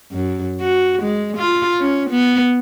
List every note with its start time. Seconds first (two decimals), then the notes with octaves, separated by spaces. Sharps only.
0.12 F#2
0.61 F#4
1.02 G#3
1.37 F4
1.80 C#4
2.11 B3